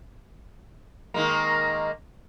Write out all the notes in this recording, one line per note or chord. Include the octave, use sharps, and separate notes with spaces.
D#3 G#3 A#3